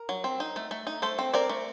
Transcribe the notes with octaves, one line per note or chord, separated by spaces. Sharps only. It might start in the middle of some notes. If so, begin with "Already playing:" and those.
Already playing: A#4
F#3
C4
D#4
A3
A3
D#4
A3 A4 C5
C4
C4 A#4 D5
A3